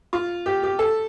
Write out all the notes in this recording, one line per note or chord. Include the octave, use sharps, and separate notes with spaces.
F4
G4
G4
A4